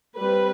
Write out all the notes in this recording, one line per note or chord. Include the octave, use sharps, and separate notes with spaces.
G3 C4 B4